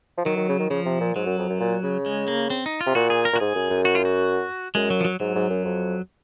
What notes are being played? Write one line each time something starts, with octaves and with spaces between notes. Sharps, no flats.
F3
D#3 F#3
D#3
C#3
D#3
C#3 F3
C3
A#2
G#2 F#3
F#2
F2
F#2
A#2
C#3
G#3
A#3
C4
D#4
F4
C3
A#2 F#4
G#4
A#4
A#2
F#4
G#2 G#4
F#2
F#2
F#4
F4
F#4
F#2 G#3
F#3
F3
F#3
G#2 F#3
G#2
F#2
F2